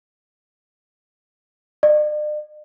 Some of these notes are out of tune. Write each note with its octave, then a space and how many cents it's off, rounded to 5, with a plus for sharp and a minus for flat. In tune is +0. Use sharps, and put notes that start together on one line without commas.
D5 +45